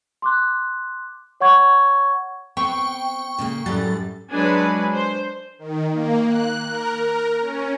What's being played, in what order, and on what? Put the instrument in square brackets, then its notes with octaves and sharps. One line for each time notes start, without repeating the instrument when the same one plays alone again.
[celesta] C6 D6 F#6
C#5 F#5 C#6 G#6
[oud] B3 [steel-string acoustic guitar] C4 [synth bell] G5 C#6
[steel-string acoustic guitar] A#2 C#3 A#3
[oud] F#2 A2 [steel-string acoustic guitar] G3 [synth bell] A6
[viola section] F#3 G#3 D4 B4 G#5
C5
[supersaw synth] D#3
A#3
F#6
A#4
A#4
C#4